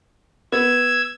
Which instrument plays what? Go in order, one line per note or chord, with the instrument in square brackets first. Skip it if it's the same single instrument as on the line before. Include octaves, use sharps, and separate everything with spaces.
[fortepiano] B3 [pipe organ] E6 G#6